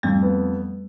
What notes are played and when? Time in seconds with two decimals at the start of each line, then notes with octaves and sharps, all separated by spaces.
0.03 F2 G3 A3
0.23 B3